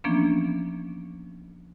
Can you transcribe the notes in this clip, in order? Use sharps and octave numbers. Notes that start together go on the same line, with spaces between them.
E3 F3 A#3 B3 C#4 D4